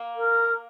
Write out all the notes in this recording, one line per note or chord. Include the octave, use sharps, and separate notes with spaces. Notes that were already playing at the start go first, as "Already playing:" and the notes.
Already playing: A#3
A#4